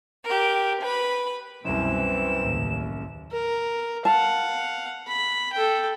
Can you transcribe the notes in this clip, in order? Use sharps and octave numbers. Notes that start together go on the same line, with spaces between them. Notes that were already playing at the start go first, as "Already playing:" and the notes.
G4 A#4
B4 B5
C2 F#2 B2 E3 C4 E7
A1 D#2 C#3
A#4
F5 F#5 A5
B5
A4 G5